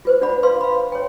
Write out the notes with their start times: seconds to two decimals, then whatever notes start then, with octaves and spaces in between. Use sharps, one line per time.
0.05 F4 B4 C5
0.21 D4 F4 D5 F#5 B5
0.43 B4 F5 C6
0.61 F5 B5
0.92 C#5 G5